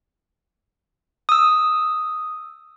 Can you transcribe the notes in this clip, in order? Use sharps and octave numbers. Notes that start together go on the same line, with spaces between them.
D#6 E6